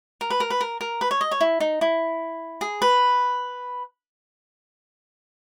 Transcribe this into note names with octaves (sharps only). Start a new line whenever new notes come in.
A#4
B4
A#4
B4
A#4
A#4
B4
C#5
D#5
C#5
E4
D#4
E4
G#4
B4